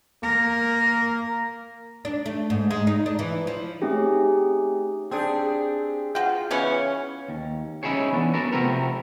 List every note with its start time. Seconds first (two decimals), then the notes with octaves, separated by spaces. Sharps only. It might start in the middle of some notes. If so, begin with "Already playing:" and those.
0.23 A#3 A#4
2.05 D4
2.26 A3
2.50 G#2
2.71 G#3
2.87 D#4
3.06 D4
3.19 E3
3.47 F3
3.82 A3 C4 C#4 D#4 G4 G#4
5.11 C4 D4 G4 G#4
6.15 F4 F#4 G5
6.51 C#3 E3 B3 C#4 C#5
7.28 D#2
7.83 C#4 D#4 E4 G4 G#4 C#5
8.12 E3 B3 D4
8.34 B3 F#4 A4 A#4
8.52 C3 F3 A3 B3 C4 A#4